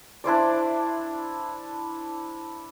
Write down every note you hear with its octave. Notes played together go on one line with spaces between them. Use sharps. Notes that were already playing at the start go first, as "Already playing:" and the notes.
D4 E4 C5 D5